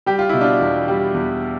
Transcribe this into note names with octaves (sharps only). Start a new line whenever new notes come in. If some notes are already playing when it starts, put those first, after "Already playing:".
G3 G4
F4
B2 E4
D4 F4
E2
G3
E2